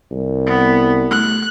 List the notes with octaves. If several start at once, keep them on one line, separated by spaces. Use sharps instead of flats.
C2
B3
A3 F#6